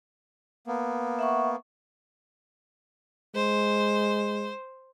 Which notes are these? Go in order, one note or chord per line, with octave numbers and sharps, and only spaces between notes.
A#3 B3
E5 F#5 C#6
G#3 C5